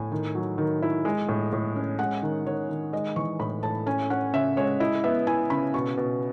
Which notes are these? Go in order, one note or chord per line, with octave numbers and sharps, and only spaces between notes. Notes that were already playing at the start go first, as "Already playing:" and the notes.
Already playing: A2 G#5
D#3
F#3
D#3
E4
G#3
A2
A2
C#4
G#3 F#5
D#3
D#3 C#5
D#3
G#3 D#5
E3 C#6
A2 B5
A2 A5
C#4 G#5
C#4 F#5
C#3 E5
G#3 C#5
E4 D#5
B3 E5
E4 G#5
C#3 B5
B2 C#6
B2